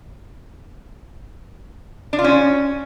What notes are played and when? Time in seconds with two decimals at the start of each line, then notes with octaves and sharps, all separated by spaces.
2.13 D4
2.19 F4
2.24 C#4